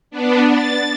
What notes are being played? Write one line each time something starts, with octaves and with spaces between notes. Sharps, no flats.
B3 D4
A6